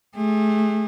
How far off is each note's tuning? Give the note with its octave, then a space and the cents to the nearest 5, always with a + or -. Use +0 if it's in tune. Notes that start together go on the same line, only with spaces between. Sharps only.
A3 -35 G#4 -40